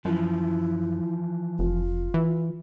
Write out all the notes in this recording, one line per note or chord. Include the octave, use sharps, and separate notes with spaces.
F#2 E3 F3 E4
F1 F4
E3